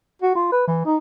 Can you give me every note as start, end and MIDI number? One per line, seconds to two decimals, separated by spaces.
0.22 0.33 66
0.35 0.51 65
0.52 0.65 71
0.68 0.83 52
0.86 0.97 63